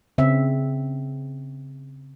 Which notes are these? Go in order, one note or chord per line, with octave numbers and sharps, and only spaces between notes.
C#3 C4 E5